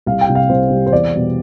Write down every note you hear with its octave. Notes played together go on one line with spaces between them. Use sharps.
C2 F5
G5
C3 G3
F5
C2 C5
C3 G3
C5
E2 D5
B2 G3